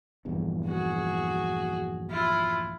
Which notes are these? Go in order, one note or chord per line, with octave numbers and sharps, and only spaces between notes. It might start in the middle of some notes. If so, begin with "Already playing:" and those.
A#1 E2 G2
F#4 G#4
E4 F4